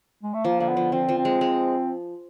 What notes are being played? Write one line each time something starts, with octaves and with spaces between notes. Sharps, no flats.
G#3
A3
F3 A#3
D3 A#3
B3
F3
F3 C4
F3
C4
G#3
G#3